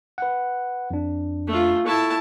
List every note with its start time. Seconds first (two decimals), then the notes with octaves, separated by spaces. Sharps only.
0.18 B4 F#5
0.91 F2 D4
1.48 A3 F4
1.87 E4 A4 A5 C#6